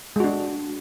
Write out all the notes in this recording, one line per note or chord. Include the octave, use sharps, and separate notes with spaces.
G#3 D4 F#4